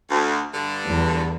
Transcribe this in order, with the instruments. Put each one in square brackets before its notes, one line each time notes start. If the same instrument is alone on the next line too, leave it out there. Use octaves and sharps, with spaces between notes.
[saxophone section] D2
G2 D3
[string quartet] E2